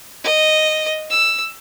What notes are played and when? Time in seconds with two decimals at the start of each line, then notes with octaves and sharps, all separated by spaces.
0.24 D#5
1.10 E6